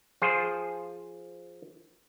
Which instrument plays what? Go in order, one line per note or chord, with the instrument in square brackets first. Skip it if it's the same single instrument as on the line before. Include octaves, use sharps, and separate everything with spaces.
[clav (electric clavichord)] F3 F4 G#4 C5